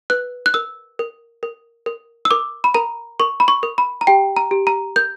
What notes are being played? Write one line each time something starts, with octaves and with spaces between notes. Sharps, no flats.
B4 F#6
F#6
A#4 E6
A#4
A#4
A#4
E6
A#4 D6
B5
A#4 A#5
A#4 C#6
B5
C#6
A#4
B5
A#5
G4 G5
A#5
G4
A#5
A#4 G6